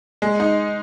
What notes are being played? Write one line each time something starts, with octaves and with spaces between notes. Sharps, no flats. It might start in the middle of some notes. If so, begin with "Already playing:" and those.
G#3
D#4